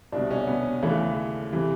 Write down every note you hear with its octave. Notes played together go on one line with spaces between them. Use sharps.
C2 B2 D4
C#4
B3
D#2 C#3 E3 A3
C3 E3